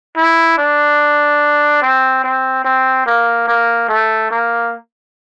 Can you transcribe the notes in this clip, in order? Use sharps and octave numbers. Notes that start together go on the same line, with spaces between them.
E4
D4
C4
C4
C4
A#3
A#3
A3
A#3